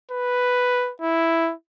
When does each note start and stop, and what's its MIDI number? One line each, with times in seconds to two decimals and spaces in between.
0.11 0.92 71
1.02 1.53 64